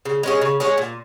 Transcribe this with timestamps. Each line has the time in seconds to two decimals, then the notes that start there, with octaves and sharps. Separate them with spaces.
0.05 C#3
0.23 G#3 C#4 G#4
0.42 C#3
0.60 G#3 C#4 G#4
0.78 A#2